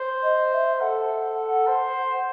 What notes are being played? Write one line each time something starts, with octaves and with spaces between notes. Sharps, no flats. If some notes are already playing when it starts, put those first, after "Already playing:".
Already playing: C5
D#5
E5
A4 F#5
C5